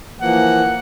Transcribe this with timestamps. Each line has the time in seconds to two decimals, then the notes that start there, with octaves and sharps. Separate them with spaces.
0.21 E3 F3 A#3 F#5